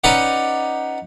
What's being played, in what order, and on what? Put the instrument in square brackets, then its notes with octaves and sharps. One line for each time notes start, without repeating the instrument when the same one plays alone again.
[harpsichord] C#4 D#4 B4 D5 F#5